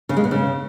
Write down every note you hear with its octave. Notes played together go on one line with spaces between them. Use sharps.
C#3
G#3
B2
C#3